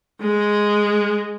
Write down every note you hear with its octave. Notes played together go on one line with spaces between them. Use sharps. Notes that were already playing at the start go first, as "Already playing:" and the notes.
G#3